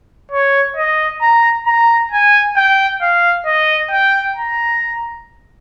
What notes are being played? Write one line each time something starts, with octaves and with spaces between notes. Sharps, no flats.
C#5
D#5
A#5
A#5
G#5
G5
F5
D#5
G5
A#5